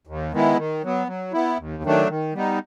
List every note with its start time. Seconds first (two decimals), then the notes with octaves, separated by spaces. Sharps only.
0.07 D#2
0.32 D#3 G#3 B3 E4
0.57 D#3
0.83 F#3 B3
1.07 F#3
1.33 B3 E4
1.58 D#2
1.83 D#3 F#3 A3 D4
2.08 D#3
2.34 G3 B3 D#4